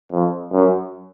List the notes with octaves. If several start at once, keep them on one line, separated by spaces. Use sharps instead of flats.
F2
F#2